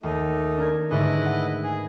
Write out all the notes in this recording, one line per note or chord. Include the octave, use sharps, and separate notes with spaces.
D#2 A3 D#4
D4 A#4 G#6
G#2 D3 A3 E4 B4 D#5
F#5 A#6
G#4